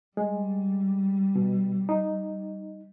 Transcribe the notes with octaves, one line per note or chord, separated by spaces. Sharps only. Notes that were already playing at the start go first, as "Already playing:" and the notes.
G3 G#3
B2
D#4